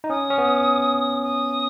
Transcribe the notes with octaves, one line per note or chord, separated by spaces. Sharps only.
D#4
C#4 D#6
C#4
B3
D#6